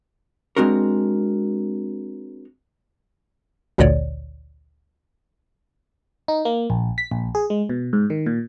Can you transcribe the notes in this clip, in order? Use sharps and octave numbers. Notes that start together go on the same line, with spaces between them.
G#3 C4 D4 F#4 A#4
A1 D2 A#2 D3 C#5 D5
D#4
A#3
A#1
B6
A#1
G#4
G#3
B2
G#2
D#3
A#2